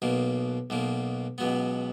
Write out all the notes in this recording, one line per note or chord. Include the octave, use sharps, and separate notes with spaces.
B1 B2 A#3
B1 B2 A#3
C#2 B2 F#3 B3